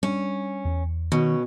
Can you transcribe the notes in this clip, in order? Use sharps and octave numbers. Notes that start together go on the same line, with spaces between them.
G3 C#4 D4
E2
B2 D#3 C#4